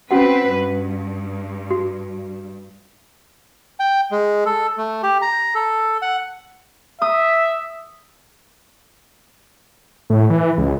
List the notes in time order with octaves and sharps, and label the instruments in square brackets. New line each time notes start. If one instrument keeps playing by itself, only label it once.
[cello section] C4 B4 [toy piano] C#4 F#4 F#5
[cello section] G2
[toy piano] F#4
[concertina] G5
G#3
A4
A3
G4
A#5
A4
F#5
[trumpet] E5 [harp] D#6
[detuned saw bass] A2
E3
C#2